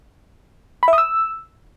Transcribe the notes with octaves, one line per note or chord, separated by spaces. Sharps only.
B5
E5
D#6
E6